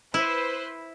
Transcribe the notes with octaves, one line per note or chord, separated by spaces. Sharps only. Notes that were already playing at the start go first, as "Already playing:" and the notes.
E4 B4 C5